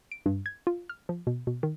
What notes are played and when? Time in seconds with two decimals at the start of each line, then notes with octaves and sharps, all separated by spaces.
0.12 D7
0.26 G2
0.46 G#6
0.67 F4
0.89 F6
1.09 F3
1.27 B2
1.47 B2
1.63 D#3